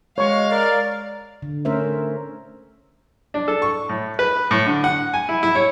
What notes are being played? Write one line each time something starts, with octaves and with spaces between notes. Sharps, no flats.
G#3 C#5 F5 C#6
A#4 D5
D3
A3 C#4 A#4 C5 E5
D4
A4
C#6
A2
B4
A2
D3
F#5
G#5
E4
E4
C#5